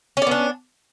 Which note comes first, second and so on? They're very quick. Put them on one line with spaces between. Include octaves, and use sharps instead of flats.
C#4 D5 B3 D4